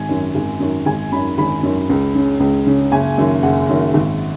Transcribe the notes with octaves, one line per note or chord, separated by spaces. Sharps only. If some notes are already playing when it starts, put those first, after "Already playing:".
Already playing: G#1 G#5
F#2 D#3
G#1
F#2 D#3
G#1 G#5
F#2 D#3 B5
G#1 B5
F#2 D#3
C#2
C#3
C#2
C#3
F#1 G#5
F#2 D#3
F#1 F#5
F#2 D#3
G#1